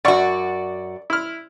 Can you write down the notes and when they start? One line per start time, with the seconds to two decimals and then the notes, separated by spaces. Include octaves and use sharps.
0.05 F#2 F#4 D5 F#5 C#6
1.10 E4 F6